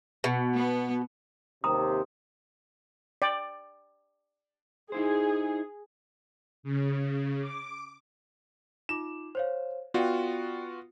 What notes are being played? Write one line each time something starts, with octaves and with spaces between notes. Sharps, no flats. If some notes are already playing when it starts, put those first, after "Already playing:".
B2
B3
D#2 C3 A#5 D#6
D5 G5
D#4 E4 G#4 C5
C#3
D6
D#4 F4 D6 E7
C5 C#5 F5
B3 F4 F#4 D5 G5